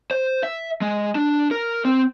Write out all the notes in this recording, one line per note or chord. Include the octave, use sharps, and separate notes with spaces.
C5
E5
G#3
D4
A#4
C4